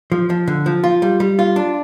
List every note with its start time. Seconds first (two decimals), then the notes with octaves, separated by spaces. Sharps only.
0.12 F3
0.30 F3
0.48 D3
0.66 F3
0.84 F4
1.02 G3
1.20 G3
1.39 F4
1.56 D4